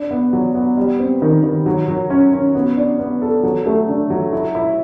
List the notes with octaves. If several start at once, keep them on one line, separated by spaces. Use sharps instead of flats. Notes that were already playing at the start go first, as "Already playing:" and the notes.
Already playing: D4
B3
F#3
B3
G3
C4
D#3
D#3
F#3
F#3
C#4
C#4
B3
D4
B3
A4
F#3
A3
D3
F#3
E4
E4